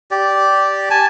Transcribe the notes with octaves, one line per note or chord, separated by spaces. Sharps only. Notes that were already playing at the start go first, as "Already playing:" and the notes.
G4 D5
G#5 A5